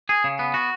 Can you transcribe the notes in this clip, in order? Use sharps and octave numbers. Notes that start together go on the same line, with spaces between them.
G#4
C#3
B3
F#4